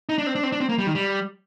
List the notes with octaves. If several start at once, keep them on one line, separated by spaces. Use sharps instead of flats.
D#4
D4
C4
D4
C4
D4
C4
A#3
G3
D#3
G3